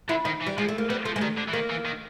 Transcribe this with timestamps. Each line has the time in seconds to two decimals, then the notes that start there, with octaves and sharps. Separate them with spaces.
0.09 D3 E4
0.25 D#3 D#4
0.41 E3
0.47 G3
0.57 F3 G#3
0.68 A3
0.78 A#3
0.89 G3 B3
1.05 F3 A3
1.16 G#3
1.21 D#3 G3
1.38 D3
1.48 E3
1.53 D#3 A#3
1.70 E3
1.85 D#3